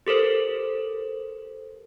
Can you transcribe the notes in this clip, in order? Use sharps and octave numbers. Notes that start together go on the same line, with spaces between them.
G4 A4 A#4 C5